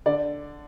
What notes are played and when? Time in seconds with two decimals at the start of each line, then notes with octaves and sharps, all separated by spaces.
0.06 D3 D5